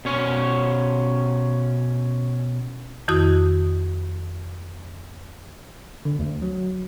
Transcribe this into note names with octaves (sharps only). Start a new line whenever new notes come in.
B2 C#4 C#5
F2 D#3 E4 F#4 D#6 G6
D3
D2
F#3